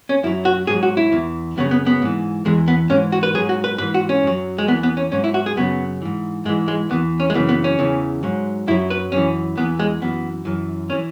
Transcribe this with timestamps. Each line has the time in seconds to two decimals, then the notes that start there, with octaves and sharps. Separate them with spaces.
0.09 C#4
0.23 F#2 E4
0.27 F#3
0.45 F#4
0.67 G#2 F#3 G#4
0.83 F#4
0.97 E4
1.12 E2 E3
1.57 F#2 C#3 F#3 B3
1.71 B3
1.86 B3
2.02 G#2 E3
2.45 E2 E3 G#3
2.68 B3
2.89 G#2 C#4
2.93 E3
3.12 F#4
3.23 B4
3.34 F#3 G#4
3.39 G#2
3.49 F#4
3.64 B4
3.78 G#2 E3 B4
3.94 F#4
4.09 C#4
4.23 F#2 F#3
4.58 G#3
4.67 E2 B3
4.71 E3
4.83 B3
4.97 C#4
5.12 G#2 F#3 C#4
5.24 E4
5.34 F#4
5.46 G#4
5.57 F#2 C#3 F#3 B3
6.02 G#2 E3
6.45 G#2 G#3
6.49 E3
6.68 G#3
6.90 E2 E3 B3
7.20 C#4
7.30 G#3
7.34 F#2 C#3 E3 B3
7.49 B3
7.64 C#4
7.79 E2 C#3 E3
8.23 G#2 F#3
8.67 F#2 E4
8.71 F#3
8.90 B4
9.12 F#2 E3 C#4
9.57 E2 E3 B3
9.79 G#3
10.02 F#2 E3 B3
10.45 F#2 E3
10.90 E3 C#4